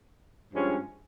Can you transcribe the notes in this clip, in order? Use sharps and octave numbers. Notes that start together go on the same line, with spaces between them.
G2 F3 G#3 C#4